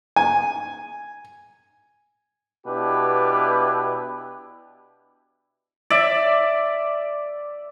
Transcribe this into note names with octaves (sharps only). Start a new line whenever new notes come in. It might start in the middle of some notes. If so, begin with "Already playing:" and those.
G#5
B2 D4 E4 G4 B4
D5 E5